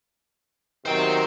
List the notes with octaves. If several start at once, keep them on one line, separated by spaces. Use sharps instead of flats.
C3 D#3 F#3 C5 G5